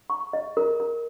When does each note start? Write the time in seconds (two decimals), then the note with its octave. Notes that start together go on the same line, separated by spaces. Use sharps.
0.10 C#6
0.33 D#5
0.57 A#4
0.80 A#4